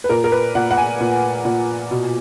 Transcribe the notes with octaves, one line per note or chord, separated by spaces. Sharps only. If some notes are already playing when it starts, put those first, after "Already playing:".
B4
A#2 A#4
A#4
B4
A#2 F#5
F#5
G#5
A#2
A#2
B2